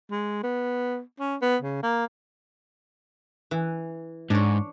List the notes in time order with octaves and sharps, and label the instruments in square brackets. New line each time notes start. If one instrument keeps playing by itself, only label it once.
[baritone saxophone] G#3
B3
C#4
B3
C#3
A#3
[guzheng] E3
[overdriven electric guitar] G#2 [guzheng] D4 C#5